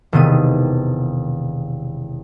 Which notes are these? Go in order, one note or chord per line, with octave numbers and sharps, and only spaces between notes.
E1 C3 D#3 B3 D#7